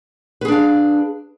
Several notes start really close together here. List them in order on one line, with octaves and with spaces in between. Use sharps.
B4 G#4 D4 F5